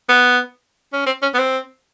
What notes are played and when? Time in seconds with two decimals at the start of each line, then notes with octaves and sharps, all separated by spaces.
0.09 B3
0.93 C#4
1.06 C4
1.22 C#4
1.34 B3
1.39 C4